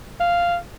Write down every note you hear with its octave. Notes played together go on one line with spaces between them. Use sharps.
F5